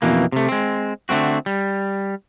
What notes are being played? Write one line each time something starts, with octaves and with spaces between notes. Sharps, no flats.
F2 B2 E3 A#3
C3 A3
G#3 C4
D3 A3 C4 F#4
G3